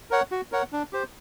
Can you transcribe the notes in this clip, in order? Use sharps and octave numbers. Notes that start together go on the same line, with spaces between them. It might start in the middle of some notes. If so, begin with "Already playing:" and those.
A#4 C#5 F#5
F#4
A#4 C#5 F#5
D4
G4 C5